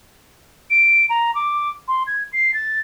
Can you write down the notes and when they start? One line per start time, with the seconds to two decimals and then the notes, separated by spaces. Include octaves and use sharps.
0.70 D7
1.10 A#5
1.35 D6
1.88 C6
2.07 G#6
2.33 C7
2.54 A6